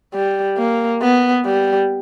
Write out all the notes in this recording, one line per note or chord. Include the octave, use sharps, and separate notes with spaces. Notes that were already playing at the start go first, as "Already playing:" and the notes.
G3
A#3
B3
G3